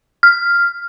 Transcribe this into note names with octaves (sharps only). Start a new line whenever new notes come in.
F6